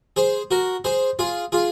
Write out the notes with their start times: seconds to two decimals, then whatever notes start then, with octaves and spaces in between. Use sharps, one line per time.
0.16 G#4 C5
0.51 F#4 A#4
0.84 G#4 C5
1.19 F4 G#4
1.52 F4 G#4